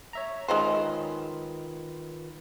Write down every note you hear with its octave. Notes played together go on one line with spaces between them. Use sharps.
C#5 E5 A#5
D#3 G#3 C#4 F4 B4 C5